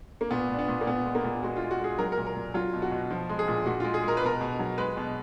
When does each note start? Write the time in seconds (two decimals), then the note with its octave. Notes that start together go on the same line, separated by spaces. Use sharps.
0.21 A#3
0.31 A#2 B3
0.49 A#2 D4
0.59 B3
0.68 A#2
0.81 A#3
0.87 A#2 B3
1.05 G#3
1.15 A#3
1.24 A#2
1.42 G#3 F#4
1.57 F4
1.62 G#3
1.71 F#4
1.80 G#3 G#4
1.98 F#3 A#4
2.12 A#4
2.17 A#2
2.26 A#4
2.36 A#2
2.54 F#3 F4
2.73 B2
2.82 F#4
2.91 B2
3.10 F3
3.29 G#3
3.39 G#4
3.48 A#2
3.66 A#2 F#4
3.80 G#3 F4
3.94 G#4
4.03 G#3 A#4
4.17 B4
4.22 B2 A#4
4.41 B2
4.59 F#3
4.78 G#3 B4
4.97 B2